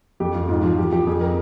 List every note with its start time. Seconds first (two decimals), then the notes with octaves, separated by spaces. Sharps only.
0.20 F2 G4
0.34 F2 F4
0.49 G#2 F4
0.63 F3 F4
0.78 F3 G4
0.92 F3 G4
1.07 F2 G#4
1.21 A#4